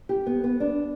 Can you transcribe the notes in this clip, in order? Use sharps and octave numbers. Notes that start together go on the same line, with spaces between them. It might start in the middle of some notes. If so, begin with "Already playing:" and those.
G4
B3
B3
D4